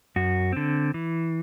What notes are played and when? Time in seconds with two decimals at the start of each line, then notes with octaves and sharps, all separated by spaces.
0.16 F#2 F#4
0.52 D3 C4
0.94 E3